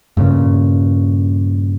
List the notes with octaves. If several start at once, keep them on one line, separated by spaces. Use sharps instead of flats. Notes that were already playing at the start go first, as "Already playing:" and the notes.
G2 A#2 C#3